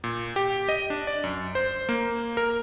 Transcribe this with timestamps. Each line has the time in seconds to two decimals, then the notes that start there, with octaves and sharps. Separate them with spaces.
0.04 A#2
0.36 G4
0.69 D#5
0.90 D4
1.07 D5
1.24 F#2
1.55 C5
1.89 A#3
2.37 A#4